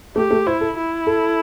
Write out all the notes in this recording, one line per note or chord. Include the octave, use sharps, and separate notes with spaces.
A3 G4
A3
E4 C5
A4
E4
A4